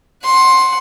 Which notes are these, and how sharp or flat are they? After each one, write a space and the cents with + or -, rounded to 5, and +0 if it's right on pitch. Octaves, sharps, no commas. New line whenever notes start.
F#5 +0 C6 +15